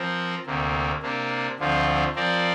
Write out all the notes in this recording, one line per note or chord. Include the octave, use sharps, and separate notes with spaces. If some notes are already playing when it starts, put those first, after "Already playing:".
Already playing: F3 C4 A#4
D2 C3 A#3
C3 A#3 D4
D2 D3 F3 C4 F4
F3 C4 A#4 D5